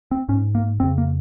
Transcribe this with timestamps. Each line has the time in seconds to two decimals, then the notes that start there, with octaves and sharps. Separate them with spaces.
0.11 C4
0.29 G#2 C#4
0.55 A#3
0.80 F2 C#3 C4
0.98 A#3